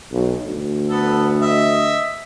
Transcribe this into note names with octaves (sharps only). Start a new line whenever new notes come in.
B1
D2
B3 A4
D#5 E5